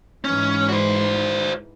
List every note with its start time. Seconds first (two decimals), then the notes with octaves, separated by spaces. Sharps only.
0.24 G#2 E3 C#4
0.69 F#4 C5